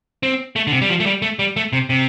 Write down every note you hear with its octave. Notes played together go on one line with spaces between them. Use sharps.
C4
A3
D3
C3
G3
F3
A3
G3
A3
G3
A3
C3
C3